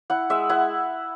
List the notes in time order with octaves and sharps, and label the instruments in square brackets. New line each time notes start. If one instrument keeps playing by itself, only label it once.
[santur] E4 F#5
G#3 E5
E4 F#5